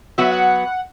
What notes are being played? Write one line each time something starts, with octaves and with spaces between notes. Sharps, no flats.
F#3 B3 F#4 E5
F#5